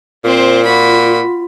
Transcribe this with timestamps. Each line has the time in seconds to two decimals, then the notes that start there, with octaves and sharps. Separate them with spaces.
0.24 A#2 C4 C5
0.65 F4 F#4 B5